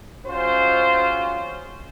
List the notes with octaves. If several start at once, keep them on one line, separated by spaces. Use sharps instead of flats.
G#3 C#4 F4 F#4 C5